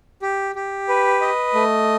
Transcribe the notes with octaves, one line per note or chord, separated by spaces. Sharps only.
G4
G4
B4
D#5
A3